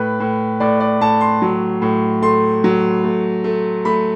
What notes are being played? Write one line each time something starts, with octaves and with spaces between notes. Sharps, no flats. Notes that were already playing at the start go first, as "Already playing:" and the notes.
Already playing: A2 B4
A2
A2 D5
D5
A2 A5
C6
F#3
A2
A3 C6
F#3
A3
A3
A3 B5